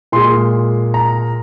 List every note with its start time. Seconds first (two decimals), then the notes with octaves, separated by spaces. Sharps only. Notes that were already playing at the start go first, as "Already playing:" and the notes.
0.12 A#2 G#3 C6
0.94 A#5